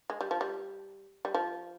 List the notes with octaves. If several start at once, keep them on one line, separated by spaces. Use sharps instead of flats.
G#3
G3
F3
G3
G3
F3